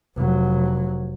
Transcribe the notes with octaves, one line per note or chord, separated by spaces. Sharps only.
F1 F#3